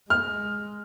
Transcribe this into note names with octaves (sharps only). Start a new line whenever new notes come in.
G#3 F6